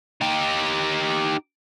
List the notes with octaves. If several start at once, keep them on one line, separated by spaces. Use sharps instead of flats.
D#4 G4